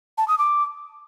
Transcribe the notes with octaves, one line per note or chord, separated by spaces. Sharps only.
A5
D#6
D6